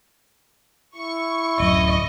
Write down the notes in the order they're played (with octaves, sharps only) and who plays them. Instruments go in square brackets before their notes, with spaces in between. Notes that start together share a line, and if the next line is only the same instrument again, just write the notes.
[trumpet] E4 [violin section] C#6
[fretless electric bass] D1 F#2 [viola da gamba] D#5